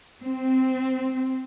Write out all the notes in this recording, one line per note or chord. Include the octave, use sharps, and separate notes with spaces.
C4